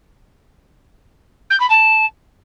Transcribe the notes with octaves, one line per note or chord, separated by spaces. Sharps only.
G6
B5
A5